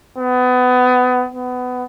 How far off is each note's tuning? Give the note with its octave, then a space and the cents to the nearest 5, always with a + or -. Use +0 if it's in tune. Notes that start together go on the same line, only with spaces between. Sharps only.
B3 +25
B3 +20